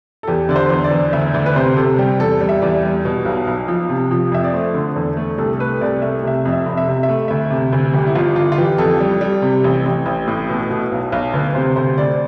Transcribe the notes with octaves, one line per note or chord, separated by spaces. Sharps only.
A4
E2 G4
D3 D5
C5
E2
D5
E2
D2 E5
D2 D5
B4
C3 C5
C3 A4
G3 G4
E2 A4
G3
E5
E2 D5
G3
B2
B1
B1
F3
C3
F3
F2 E5
D5
A3 C5
D3
E2 A4
A3
C2 A4
A4
A3 B4
C2 D5
A3 E5
C3 E5
F2
E5
F1
E5
C3
E5
A3
D2 E5
C3
D2
G1 G4
E4
G1 F4
G1 F4
F4
E3 G4
F2 A4
G3
G3
C3
A1
A1
A1
A2
B2
B2
B1
B1
D2 B4
C3 C5
D2 C5
D2 D5